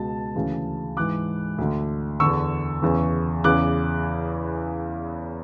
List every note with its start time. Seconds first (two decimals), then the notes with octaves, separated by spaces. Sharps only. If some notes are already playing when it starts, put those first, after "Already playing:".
Already playing: C#2 B2 A5
0.35 D2 C#3 E3
0.97 G#2 E3 D6 F#6
1.58 D2 D3
2.20 E2 D3 C#6 E6
2.82 E2 C#3 E3
3.44 E2 C#3 E3 D6 F#6